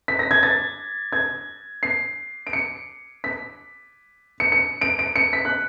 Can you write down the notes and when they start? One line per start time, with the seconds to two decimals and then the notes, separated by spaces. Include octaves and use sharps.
0.08 B6
0.19 A#6
0.31 G#6
0.43 A6
1.12 G#6
1.83 C7
2.47 D7
2.53 C#7
3.24 B6
4.40 C#7
4.52 C#7
4.81 D7
4.99 D7
5.16 C#7
5.33 B6
5.45 F#6